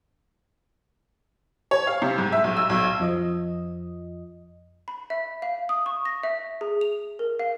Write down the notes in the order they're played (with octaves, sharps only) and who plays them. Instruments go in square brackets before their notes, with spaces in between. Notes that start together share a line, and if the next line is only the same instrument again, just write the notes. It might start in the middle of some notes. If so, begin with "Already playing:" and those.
[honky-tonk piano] C#5
F5
C3
G#2
E5
B1
E6
B1
[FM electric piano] F2 F3 D#5
[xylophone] B5
E5
F5
D#6
C#6
A#6
E5
G#4
F7
A#4
F5